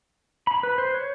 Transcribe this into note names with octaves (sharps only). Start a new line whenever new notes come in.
B5
B4
C5
C#5